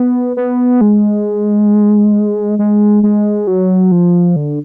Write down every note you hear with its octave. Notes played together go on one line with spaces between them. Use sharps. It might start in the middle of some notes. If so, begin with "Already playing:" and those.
Already playing: B3
B3
G#3
G#3
G#3
F#3
F3
D3